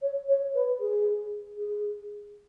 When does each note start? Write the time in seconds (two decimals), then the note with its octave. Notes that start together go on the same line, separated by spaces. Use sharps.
0.01 C#5
0.28 C#5
0.54 B4
0.80 G#4
1.57 G#4